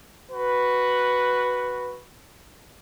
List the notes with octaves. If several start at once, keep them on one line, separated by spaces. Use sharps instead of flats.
F#4 B4